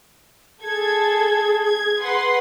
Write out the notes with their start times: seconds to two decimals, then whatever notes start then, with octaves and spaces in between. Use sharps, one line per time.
0.63 G#4 A4 G#6
1.62 G#6
2.02 B4 F#5 C6